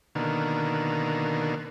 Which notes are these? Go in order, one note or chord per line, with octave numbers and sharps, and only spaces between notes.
B2 D3 D#3 A#3